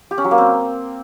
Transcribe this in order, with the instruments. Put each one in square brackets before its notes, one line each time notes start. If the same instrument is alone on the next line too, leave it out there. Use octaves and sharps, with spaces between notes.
[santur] G4
C#4
F#3
A#3
C4